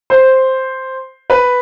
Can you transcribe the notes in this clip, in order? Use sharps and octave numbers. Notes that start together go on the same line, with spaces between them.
C5
B4